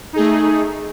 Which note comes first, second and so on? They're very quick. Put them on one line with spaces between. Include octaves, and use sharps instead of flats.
D#4 G#4 A3